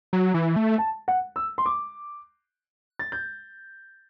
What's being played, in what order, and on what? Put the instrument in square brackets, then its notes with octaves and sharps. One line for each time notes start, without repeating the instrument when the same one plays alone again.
[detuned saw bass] F#3
E3
A3
[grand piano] A5
F#5
E6
C6
D6
A6
G6